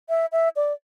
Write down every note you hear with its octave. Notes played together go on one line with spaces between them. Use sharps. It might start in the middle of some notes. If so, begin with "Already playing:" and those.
E5
E5
D5